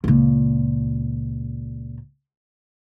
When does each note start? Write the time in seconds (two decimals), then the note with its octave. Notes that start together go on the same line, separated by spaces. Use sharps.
0.04 C#2 A#2